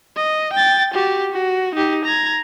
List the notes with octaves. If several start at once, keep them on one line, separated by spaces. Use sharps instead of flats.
D#5
G5 A6
F#4 G4
F#4
D#4 G4
A#5 G#6